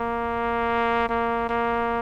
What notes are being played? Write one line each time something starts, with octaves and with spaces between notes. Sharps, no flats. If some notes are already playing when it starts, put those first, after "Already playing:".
Already playing: A#3
A#3
A#3